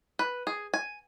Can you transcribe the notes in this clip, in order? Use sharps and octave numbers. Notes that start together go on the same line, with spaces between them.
B4
G#4
G#5